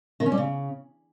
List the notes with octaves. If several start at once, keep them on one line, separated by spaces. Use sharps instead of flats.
D#3
C#4
G3
C#3